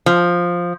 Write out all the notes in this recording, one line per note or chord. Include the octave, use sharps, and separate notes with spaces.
F3